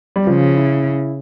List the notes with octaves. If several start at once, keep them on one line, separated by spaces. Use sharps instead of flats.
G3
C#3 F3
E4